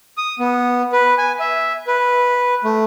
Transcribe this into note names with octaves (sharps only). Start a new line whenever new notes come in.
D#6
B3
B4
G#5
E5
B4
A3